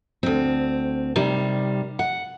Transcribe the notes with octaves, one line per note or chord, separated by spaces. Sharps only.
D2 C4
C3 D#3 G3
F#5